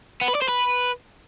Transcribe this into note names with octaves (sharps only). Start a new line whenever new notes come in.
B3
B4
D5
C5
B4